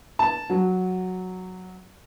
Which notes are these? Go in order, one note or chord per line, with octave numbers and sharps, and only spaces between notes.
A5
F#3